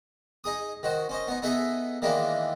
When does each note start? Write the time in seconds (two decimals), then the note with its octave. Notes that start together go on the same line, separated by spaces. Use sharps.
0.44 D#4 G#4 D#6
0.83 D#3 F#4 C5
1.09 C#4 C5 D#5
1.28 B3 D#4
1.42 B3 D#4 G#4 A4 E5
2.02 D#3 E3 G#3 A#3 D4 E4